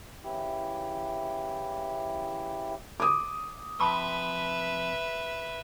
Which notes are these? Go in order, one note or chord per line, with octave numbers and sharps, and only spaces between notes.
C#3 E3 E4 G4
D6 D#6
C3 F3 B4 E5 A5 B5 C6 E6